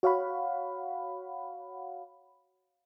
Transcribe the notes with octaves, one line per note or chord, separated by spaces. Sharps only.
F#4 C#5 F5 F#5 B5